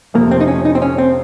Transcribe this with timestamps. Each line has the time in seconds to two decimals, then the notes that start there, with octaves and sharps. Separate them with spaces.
0.14 F2 C3 F3 A3 A#3
0.31 C4
0.40 D#4
0.48 C#4
0.65 D#4
0.75 C4
0.82 C#4
0.98 C4